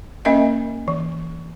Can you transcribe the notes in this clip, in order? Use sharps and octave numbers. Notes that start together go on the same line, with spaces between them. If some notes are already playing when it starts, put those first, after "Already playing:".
A#3 C#4 A#4 D#5 E5
E3